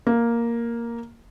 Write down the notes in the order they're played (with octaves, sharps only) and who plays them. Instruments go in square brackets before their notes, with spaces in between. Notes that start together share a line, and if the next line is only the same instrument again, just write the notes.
[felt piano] A#3